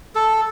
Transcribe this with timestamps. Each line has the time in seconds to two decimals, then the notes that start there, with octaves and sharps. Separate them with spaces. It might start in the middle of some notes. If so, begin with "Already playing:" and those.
0.15 A4